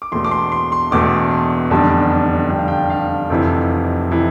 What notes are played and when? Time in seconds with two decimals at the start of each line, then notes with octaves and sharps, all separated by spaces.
0.02 D6
0.12 E1 E2 B2 A3 C6
0.25 D6
0.31 C6
0.52 C6
0.72 C6
0.91 E1 E2 B2 A3 D6
1.31 C6
1.70 F1 E2 D3 G3 D4 A5
2.11 A5
2.50 F1 E2 D3 G3 D4 G5
2.59 F5
2.68 G5
2.90 F5
3.29 F1 F2 C3 E3
4.11 C3 E3